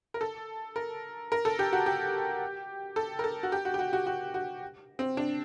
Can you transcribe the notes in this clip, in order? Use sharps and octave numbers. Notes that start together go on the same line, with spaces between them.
A#4
A4
A#4
A#4
A4
G4
F#4
G4
A4
A#4
A4
F#4
G4
F#4
G4
F#4
F#4
F#4
F#4
C4
D4